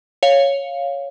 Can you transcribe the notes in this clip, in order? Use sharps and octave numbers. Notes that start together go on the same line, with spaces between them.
C#5 F5